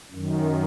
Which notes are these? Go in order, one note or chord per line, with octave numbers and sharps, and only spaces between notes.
F#2 D#3